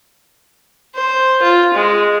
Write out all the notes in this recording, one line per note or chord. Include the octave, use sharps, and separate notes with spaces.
C5
F4
G#3